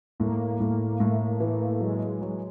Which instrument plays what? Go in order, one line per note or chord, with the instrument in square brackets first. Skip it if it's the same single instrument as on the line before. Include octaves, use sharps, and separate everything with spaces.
[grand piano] A2 [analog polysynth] A#3
[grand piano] A2 [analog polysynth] A#3
[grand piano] A2 [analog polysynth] A3
[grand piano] E3 [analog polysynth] A3
[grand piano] F#3 [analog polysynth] G#3
[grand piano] F#3